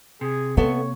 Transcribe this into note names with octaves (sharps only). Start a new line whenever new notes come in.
C3 G#4
A#3 B3 A4 C#5 E5